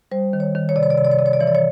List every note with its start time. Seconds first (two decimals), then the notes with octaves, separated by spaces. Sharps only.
0.11 G3 C5
0.33 D#3
0.40 C#5
0.55 D#3
0.69 C#5
0.76 C3 D5
0.83 C#5
0.90 D5
0.97 C3 C#5
1.05 D5
1.12 C#5
1.19 C3 D5
1.26 C#5
1.33 D5
1.40 E3 C#5
1.47 D5
1.55 C#5